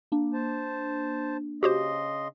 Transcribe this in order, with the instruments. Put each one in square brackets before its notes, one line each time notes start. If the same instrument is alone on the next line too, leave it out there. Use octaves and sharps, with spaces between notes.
[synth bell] A#3 D4
[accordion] C5 A5
[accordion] C#3 D#5 C6 [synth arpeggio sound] F#4 G4 C5